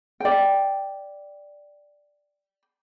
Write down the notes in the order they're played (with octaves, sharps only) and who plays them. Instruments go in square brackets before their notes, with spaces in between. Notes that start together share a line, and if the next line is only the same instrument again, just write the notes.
[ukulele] D5 G5